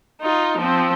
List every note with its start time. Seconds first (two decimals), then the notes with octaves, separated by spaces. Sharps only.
0.21 D#4 F4
0.58 F3 C4